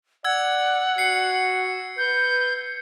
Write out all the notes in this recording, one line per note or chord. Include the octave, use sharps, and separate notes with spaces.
D5 F#5 E6 G#6
F#4 C7 C#7
B4 G6